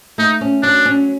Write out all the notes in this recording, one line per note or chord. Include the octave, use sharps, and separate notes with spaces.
A3 D#4
C#4
F#3 D4
C#4